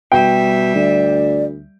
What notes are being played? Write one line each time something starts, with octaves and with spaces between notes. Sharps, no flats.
B2 G3 E5 G5
D2 D5